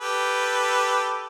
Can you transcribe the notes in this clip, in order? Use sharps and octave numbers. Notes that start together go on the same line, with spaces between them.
G4 A4 B4